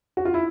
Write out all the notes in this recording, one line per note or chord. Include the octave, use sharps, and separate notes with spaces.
F#4
F4
E4